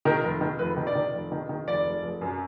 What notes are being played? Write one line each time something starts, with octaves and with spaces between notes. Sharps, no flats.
D#3 A#4
F1
D#3
F1 B4
D#3
D5
D#3
F1
D#3
D#3
F1 D5
F1
F1
F#2